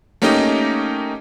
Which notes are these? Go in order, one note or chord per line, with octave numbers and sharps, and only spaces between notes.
A3 A#3 C#4 D#4 G4 D#5